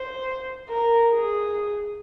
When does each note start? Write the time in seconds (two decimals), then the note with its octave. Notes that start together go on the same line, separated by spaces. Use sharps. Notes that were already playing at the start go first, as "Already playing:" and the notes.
Already playing: C5
0.69 A#4
1.11 G#4